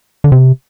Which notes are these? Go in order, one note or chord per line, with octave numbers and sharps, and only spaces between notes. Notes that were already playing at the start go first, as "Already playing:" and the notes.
D3
C3